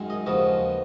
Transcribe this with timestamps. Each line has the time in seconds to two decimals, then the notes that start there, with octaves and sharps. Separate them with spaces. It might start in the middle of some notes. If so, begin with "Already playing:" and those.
Already playing: F#2 D#3 G#3
0.10 D#5
0.26 D#2 C#3 F3 B3 D#5